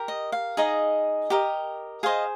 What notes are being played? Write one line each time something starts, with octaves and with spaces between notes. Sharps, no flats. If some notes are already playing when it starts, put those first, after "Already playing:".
Already playing: G4 A#4
D#5
F5
D#4 G#4 D#5
G4 A#4 D#5
G#4 C5 D#5 F5